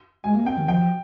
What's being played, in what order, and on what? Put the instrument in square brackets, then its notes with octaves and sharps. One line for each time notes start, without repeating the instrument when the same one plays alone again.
[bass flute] G#3 [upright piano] G#5
[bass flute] A#3
[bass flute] C4 [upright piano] G5
[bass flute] D#3
[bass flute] F3 [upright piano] G5